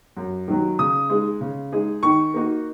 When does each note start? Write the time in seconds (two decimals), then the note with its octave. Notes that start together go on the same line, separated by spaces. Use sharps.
0.17 F#2
0.48 D#3 F#3
0.79 C#3 D#6
1.09 G#3 D#4 G#4
1.41 C#3
1.72 G#3 D#4 G#4
2.03 D#3 C#6
2.34 A#3 D#4 F#4